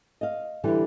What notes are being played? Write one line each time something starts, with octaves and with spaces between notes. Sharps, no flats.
D#5 F5
D3 E3 G3 G4